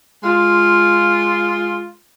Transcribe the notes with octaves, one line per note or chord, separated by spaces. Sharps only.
G#3 F4